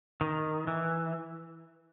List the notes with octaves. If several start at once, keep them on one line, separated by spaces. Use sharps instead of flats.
D#3
E3